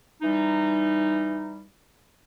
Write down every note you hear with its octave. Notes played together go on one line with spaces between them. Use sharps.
E3 G3 D#4